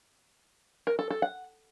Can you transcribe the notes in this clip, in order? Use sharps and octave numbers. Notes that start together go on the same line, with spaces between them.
A#4
A4
A4
F#5